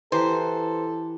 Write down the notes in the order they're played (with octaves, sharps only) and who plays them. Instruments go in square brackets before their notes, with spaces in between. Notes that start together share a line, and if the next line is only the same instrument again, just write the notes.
[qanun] E3 G4 [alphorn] A4 [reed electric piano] B4 A#5 [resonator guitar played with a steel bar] C5